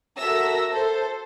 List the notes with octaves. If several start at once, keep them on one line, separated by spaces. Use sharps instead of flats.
F#4 A4 A#4 E5 E6 A#6
A4 C5